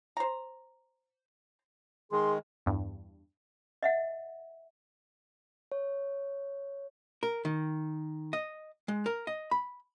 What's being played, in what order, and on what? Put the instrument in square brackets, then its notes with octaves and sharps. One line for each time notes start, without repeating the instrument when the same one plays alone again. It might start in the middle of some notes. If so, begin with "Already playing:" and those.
[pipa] C5 A#5
[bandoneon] D#3 G#3 [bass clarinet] G#4 [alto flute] C6
[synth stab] E2 G2
[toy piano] D#5 E5 F#5
[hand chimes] C#5
[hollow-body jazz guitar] A#4
D#3
D#5
G#3
A#4
D#5
B5